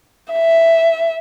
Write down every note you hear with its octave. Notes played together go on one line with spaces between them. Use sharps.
E5